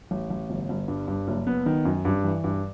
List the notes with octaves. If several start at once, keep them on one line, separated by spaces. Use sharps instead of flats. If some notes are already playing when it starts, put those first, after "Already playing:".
A1
A1
G1
G1
G2
G2
F#1
B3
D#3
F#2
G2
E3
G2